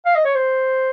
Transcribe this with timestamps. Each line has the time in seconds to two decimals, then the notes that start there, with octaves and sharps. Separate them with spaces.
0.06 F5
0.15 D#5
0.25 C#5
0.35 C5